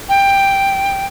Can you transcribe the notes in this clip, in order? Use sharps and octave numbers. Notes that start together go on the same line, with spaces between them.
G5